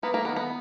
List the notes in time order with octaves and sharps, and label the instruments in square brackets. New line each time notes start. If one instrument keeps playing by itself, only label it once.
[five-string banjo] A#3 [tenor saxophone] B3
[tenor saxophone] A3 [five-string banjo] A#3
[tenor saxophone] D#3 [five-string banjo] B3
[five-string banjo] B3